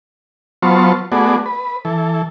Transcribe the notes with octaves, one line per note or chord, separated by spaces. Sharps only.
F#3 B3 F4 C5 A5 C#6
A3 B3 F#4 G#4 D5
B4
E3 A4